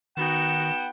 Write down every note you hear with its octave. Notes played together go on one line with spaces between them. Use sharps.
D#3 B3 D#4 F#4 F#5 G5 E7